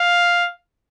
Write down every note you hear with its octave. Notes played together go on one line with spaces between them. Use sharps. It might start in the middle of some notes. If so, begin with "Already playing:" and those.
Already playing: F5